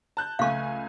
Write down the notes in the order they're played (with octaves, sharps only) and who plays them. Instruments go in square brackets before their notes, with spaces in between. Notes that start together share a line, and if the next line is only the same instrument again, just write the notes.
[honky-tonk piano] A5 F#6 G6
[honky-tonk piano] C#2 A3 G#5 [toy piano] F5 C#6